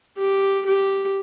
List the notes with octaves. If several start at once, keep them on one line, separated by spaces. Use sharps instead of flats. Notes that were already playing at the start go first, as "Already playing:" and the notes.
G4
G4